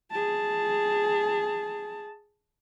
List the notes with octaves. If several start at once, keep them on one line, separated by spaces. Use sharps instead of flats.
G#4 A5